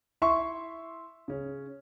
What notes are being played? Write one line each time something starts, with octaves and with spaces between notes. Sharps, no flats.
E4 E5 C6 C#6
C#3 C#4